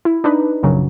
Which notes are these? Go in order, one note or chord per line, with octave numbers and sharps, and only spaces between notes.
E4
D4 D#4 B4
A#1 F#2 C#3 F#3